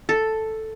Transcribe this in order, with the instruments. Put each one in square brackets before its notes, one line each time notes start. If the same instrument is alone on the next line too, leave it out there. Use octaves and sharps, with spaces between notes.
[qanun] A4